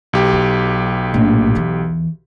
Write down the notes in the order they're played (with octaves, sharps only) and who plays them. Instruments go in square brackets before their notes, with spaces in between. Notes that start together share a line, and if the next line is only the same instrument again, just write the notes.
[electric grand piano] B1 G4
[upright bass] F#3
A#1 A2
E2 E3